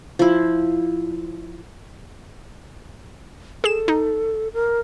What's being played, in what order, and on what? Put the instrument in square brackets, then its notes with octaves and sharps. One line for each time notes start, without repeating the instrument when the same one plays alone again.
[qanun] F3 E4
[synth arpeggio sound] G#4 E7 [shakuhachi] A4
[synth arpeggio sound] D#4
[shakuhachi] A#4